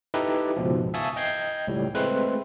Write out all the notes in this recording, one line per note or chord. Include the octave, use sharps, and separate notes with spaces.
D#4 E4 G4 A4 B4 D#5
C#2 G#2 B2 F3
E5 F5 G#5 A5 C#6 D#6
D#5 G5 G6 G#6 C7
C#2 A2 G3
G#3 A3 C4 B4 C6 F#6